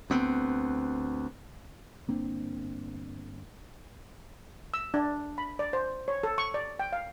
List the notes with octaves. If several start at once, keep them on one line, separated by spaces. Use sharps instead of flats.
D2 B3 C4
G1 A#3 C4 D4
E6
D4
B5
D5
C5
C#5
A4
C#6
D5
G5
F5